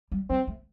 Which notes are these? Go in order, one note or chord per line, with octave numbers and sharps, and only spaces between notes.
G3
G3 C4
A3